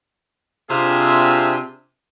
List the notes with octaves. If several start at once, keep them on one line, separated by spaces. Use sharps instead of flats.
C3 C4 D4 F4 G#4 E5